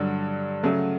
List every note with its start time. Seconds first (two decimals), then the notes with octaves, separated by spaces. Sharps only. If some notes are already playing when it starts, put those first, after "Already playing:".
Already playing: G2 D3 F#3
0.63 C#3 F#3 A3